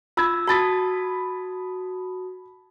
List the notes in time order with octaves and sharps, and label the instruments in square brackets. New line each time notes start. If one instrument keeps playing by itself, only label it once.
[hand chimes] F4 E6 [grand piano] B5 G#6
[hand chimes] F#4 A5 D#6 [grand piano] B5 A6 B6